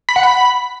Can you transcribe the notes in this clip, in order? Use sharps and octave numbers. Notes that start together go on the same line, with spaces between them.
B5
F#5
B5